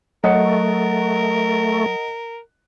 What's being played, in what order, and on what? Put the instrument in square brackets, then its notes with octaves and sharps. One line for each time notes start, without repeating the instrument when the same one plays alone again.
[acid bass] F#3 [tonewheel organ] A3 [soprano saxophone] A#4 [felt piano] D#5 F#5 C#7